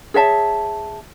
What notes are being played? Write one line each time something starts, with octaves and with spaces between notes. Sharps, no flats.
G#4 C#5 E5 A5